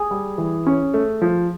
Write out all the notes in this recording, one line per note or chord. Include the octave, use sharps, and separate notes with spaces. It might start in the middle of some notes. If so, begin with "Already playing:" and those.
Already playing: G#4
G3
E3
C#4
A3
F3